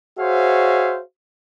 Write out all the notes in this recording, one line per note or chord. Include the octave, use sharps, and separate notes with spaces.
F#4 G#4 C5 C#5 E5 F5